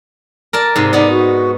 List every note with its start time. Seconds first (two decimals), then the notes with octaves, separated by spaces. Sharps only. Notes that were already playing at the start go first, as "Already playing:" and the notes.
0.53 A#4 D5 A5
0.76 G#2 C3
0.93 B3 D#4 D5
1.10 F#4